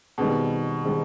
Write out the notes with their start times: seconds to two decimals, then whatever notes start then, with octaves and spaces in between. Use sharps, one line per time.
0.18 B2 D#3 G3 C4 D#4 G#4
0.84 D#3 G3 C4 D#4 G#4